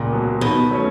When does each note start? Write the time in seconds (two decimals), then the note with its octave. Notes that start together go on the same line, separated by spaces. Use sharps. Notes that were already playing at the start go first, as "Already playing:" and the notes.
Already playing: C#2 A#2
0.12 B2 F#3
0.41 B2 D#3
0.71 F#3 A3 C#4